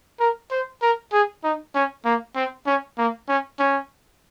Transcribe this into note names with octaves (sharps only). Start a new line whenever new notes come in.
A#4
C5
A#4
G#4
D#4
C#4
A#3
C4
C#4
A#3
C#4
C#4